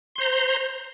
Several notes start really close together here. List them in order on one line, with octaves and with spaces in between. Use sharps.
C6 C5 A#5